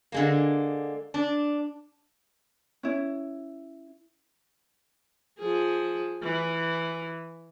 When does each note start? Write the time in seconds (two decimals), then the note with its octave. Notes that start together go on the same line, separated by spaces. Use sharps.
0.12 D3 G#3 A#3
1.14 D4
2.83 C#4 E4
5.39 F3 G#4
6.23 E3